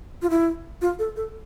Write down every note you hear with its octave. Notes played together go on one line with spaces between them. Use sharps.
F4
E4
F4
A4
A4